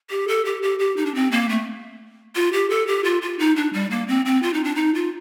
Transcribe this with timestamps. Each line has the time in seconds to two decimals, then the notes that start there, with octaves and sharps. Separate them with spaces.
0.10 G4
0.28 A4
0.45 G4
0.63 G4
0.79 G4
0.97 D#4
1.06 D4
1.15 C4
1.32 A#3
1.49 A3
2.36 F4
2.53 G4
2.70 A4
2.87 G4
3.04 F4
3.22 F4
3.39 D#4
3.56 D4
3.73 G3
3.91 A#3
4.08 C4
4.26 C4
4.43 F4
4.54 D#4
4.64 D4
4.76 D#4
4.95 F4